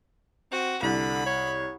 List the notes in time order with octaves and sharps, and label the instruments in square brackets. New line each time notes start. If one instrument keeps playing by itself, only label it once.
[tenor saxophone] C4 [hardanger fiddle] F#4
[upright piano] C2 [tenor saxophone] D3 [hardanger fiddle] B5
[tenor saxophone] C#5